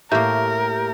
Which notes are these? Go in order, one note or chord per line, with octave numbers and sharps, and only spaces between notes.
A2 A#3 G4 A#4 E5 G6